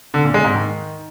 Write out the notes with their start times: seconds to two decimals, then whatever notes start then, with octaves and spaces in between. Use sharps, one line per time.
0.14 D3
0.24 A#2
0.34 G#3
0.44 G#2
0.55 D#3